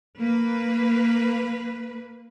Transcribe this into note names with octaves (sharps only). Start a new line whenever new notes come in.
A#3 B4